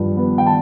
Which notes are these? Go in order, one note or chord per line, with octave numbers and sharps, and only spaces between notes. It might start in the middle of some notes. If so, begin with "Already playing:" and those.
Already playing: G2 F3
B3
G5
A5